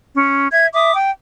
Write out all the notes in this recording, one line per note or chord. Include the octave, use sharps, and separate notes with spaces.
C#4
E5 G#6
E5 D6 D#6
G5